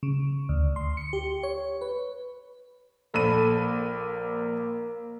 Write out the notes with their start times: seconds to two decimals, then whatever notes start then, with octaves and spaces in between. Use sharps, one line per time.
0.03 C#3
0.49 D2
0.76 C6
0.97 C#7
1.13 G4
1.43 C#5
1.81 B4
3.14 A#1 A4 B5 D#7
3.56 A#3